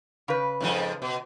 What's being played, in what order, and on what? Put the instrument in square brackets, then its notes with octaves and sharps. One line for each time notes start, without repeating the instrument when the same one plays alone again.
[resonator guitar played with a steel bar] C#3 B4
[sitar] F2 G#2 F3
B2